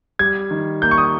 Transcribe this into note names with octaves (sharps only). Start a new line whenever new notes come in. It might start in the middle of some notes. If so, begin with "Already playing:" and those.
G3 G#6
D#3
A#3 G6
C#6
D#6